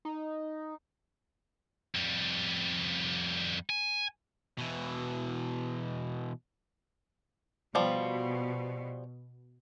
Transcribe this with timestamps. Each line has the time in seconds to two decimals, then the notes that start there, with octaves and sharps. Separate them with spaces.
0.05 D#4
1.95 F2 G3
3.70 G#5
4.58 B2 E3
7.75 B2 F3 G3